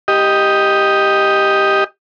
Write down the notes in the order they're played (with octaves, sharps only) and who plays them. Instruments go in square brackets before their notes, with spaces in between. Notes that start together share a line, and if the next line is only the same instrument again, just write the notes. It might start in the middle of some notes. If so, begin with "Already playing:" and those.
[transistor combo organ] G4 D#5